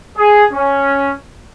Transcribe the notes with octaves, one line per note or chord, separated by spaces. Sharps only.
G#4
C#4